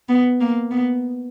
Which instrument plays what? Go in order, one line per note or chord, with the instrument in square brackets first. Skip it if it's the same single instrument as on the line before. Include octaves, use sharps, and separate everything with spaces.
[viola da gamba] B3
A#3
B3